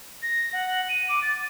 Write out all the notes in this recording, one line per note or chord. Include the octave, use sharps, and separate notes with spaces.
A#6
F#5
D#7
D6
A6